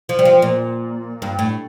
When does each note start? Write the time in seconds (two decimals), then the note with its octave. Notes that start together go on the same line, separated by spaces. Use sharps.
0.09 F3
0.19 G3
0.25 F3
0.42 A#2
1.22 G2
1.39 A2